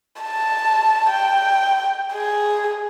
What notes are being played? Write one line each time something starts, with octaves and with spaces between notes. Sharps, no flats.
A5
G5
G#4